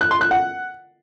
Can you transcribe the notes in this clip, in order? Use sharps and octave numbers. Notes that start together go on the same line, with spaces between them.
F#6
C6
F#6
F#5